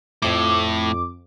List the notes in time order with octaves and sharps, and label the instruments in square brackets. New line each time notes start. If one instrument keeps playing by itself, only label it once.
[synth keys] F2 D6 [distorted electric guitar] A2